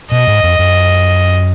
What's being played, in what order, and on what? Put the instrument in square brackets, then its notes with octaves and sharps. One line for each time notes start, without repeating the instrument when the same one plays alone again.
[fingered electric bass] B2 [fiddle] D#5
[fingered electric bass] G#2
F2
F#2